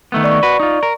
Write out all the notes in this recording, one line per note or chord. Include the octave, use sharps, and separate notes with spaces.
D#3 A3 B3
D5 C#6
F#4 B4
D#4 F4
A#4